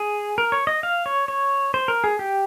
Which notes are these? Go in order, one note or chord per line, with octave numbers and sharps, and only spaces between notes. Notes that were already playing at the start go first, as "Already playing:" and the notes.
Already playing: G#4
A#4
C#5
D#5
F5
C#5
C#5
C5
A#4
G#4
G4